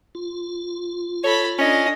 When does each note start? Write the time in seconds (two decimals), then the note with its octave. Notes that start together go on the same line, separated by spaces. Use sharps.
0.15 F4
1.24 A4 C#5 B5
1.59 C#4 D4 D#5